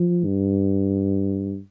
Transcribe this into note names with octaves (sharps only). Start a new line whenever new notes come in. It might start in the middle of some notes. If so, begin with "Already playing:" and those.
Already playing: F3
G2